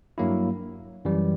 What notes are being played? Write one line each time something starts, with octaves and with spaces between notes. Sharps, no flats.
G2 F#3 A#3 E4
F#2 E3 G3